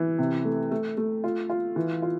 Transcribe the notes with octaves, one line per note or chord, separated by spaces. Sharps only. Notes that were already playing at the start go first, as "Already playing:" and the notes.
Already playing: E3
C3
A3
A3
A3
F4
F4
E3
F4